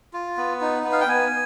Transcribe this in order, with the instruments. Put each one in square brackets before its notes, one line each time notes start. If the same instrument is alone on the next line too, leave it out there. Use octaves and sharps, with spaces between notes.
[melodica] F4
B3
D#4
B3
F5
G5
B3 G#5